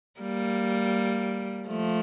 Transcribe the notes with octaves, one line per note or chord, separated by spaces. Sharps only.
G3 A#3
F3 A3